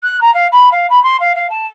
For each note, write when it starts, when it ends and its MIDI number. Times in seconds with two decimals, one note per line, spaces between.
0.03 0.20 90
0.21 0.32 82
0.34 0.47 77
0.52 0.69 83
0.71 0.86 77
0.90 1.01 83
1.03 1.16 84
1.20 1.32 77
1.35 1.47 77
1.50 1.66 81